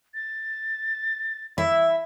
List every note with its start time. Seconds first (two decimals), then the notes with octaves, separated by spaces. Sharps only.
0.14 A6
1.58 E4 E5